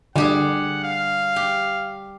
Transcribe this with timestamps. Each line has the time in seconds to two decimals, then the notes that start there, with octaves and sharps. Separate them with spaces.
0.16 D3 G3 G4 G#4 F#5
0.84 F5
1.36 G4